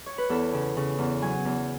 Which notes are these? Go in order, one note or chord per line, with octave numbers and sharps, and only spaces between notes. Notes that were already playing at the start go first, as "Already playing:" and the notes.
C#5
B4
E2 A4
C#3
C#3
E2
F#3 G#5
E2